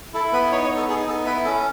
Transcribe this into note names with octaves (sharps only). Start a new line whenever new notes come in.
E4 A4
B3 B4
D#4 C#5
C#5
B3
A4
D#4 G#4
B3 A4
E4 B4
C#4 A4